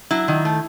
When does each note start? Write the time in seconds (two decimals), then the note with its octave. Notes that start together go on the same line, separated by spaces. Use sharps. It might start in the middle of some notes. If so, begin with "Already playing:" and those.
0.11 F#3 E4
0.28 D#3
0.45 A3